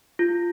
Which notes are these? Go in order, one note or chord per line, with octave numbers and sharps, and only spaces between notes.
F4